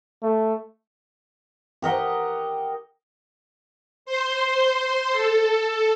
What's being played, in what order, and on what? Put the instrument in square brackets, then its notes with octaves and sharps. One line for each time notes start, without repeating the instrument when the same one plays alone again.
[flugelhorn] A3
[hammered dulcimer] G4 A#4 D#5 F#5
[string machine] C5 C6
A4